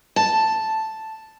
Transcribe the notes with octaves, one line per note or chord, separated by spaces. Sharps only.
A5